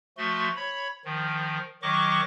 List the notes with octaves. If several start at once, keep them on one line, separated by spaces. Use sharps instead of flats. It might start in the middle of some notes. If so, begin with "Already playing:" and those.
F3 A3 F#4 C6
C#5 B5
D#3 F3
D#3 F#3 D#5 C#6 D6